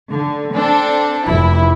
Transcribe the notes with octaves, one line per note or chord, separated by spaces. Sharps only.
D3
C4 D4 A4
F1 E4